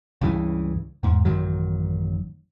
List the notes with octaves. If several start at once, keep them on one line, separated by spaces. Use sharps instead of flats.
C#2 G2 C#3 E3
E2 G#2
A1 F#2 D#3 F#3